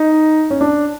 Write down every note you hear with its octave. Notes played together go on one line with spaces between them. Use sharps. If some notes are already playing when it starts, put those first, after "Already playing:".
Already playing: D#4
C#4
D4